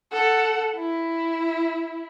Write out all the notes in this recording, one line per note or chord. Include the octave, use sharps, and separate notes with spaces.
A4 F#5
E4